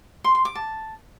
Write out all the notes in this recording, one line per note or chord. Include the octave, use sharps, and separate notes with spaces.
C6
C6
D6
A5